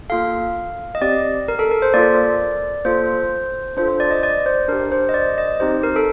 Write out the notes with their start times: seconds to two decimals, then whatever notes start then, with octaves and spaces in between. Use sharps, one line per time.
0.10 A#3 F4 A4 F5
0.95 D#5
1.01 C4 G4 D5
1.48 A#4
1.59 A4
1.71 A#4
1.82 C5
1.94 A#3 F4 A4 D5
2.85 A#3 F4 A4 C5
3.77 D4 F4 A4 C5
3.88 C5
4.00 D5
4.11 D#5
4.23 D5
4.46 C5
4.68 D4 G4 A#4
4.92 C5
5.09 D#5
5.14 D5
5.38 D#5
5.60 C4 D#4 G4 C5
5.83 A#4
5.96 A4